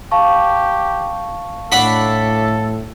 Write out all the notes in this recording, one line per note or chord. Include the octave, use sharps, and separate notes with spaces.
G4 F5 A5 C#6
A2 D4 A4 F#5 B5